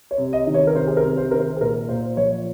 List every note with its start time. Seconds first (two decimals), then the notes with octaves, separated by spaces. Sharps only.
0.11 C#5
0.18 C3
0.33 D#5
0.47 D#3
0.54 C#5
0.67 A#4
0.75 C3 C5
0.88 G#4
0.97 A#4
1.03 C3
1.17 C5
1.31 D#3 A#4
1.39 C5
1.56 G#4
1.60 A#2 A#4
1.89 A#2 C5
2.17 F3 C#5